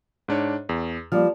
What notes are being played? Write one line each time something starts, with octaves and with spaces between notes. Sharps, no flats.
G#2 D4 C#5
E2
F3 G3 A#3 F6